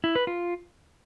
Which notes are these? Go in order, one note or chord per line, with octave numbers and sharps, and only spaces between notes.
E4
B4
F4